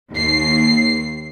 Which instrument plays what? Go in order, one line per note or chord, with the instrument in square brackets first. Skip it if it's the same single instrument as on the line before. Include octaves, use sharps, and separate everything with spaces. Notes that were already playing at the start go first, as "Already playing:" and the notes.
[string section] D#2 C7